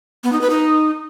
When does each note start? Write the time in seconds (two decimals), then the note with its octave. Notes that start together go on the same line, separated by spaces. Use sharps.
0.24 B3
0.33 D#4
0.41 B4
0.50 D#4